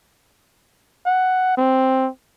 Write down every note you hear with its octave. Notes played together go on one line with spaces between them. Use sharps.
F#5
C4